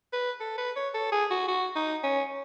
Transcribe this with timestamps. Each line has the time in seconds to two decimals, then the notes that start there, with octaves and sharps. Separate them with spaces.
0.13 B4
0.40 A4
0.58 B4
0.76 C#5
0.94 A4
1.12 G#4
1.30 F#4
1.48 F#4
1.76 D#4
2.03 C#4